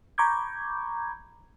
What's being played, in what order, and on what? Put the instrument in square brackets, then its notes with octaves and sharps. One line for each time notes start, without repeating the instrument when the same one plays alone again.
[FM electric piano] A#5 B5 C#6 D6 G6 G#6